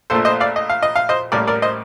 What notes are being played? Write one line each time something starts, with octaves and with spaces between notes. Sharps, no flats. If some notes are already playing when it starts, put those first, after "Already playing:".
A#1 A#2 A3 A4 C5
C5 D#5
D5 F5
D#5
F5
D#5
F5
C5 D#5
A1 A2 G3 A#3 A#4 D5
A#4 D5
C5 D#5